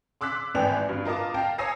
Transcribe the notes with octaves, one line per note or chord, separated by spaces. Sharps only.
C6 D6 E6 F#6 B6
G#1 E2 B3 D5 G5 F7
G2
F4 A#4 D#5 A5 D6
F5 G5 A5 A#5
C#5 G#5 D#6 E6 A#6 C7